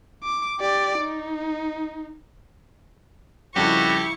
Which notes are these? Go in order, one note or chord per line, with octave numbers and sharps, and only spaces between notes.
D6
G4 D5
D#4
F2 C#3 G3 E4 F#4 G4 C#6